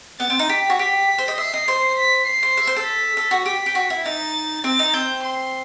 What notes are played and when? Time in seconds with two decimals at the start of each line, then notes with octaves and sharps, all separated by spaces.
0.20 B3 A6
0.30 C4
0.39 D#4
0.49 G4 B6
0.70 F#4
0.79 G4 B6
1.18 C5
1.28 D#5
1.38 E5 C7
1.54 D#5
1.68 C5
1.98 B6
2.27 C7
2.43 C5
2.57 E5
2.67 C5
2.76 A4
2.86 B6
3.17 A4
3.31 F#4
3.45 G4 B6
3.66 G4
3.75 F#4
3.90 E4
4.05 D#4 A6
4.64 C4 A6
4.79 D#4
4.94 C4 G6
5.24 C6